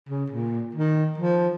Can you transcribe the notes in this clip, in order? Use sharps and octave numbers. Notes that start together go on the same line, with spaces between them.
C#3
A#2
D#3
F3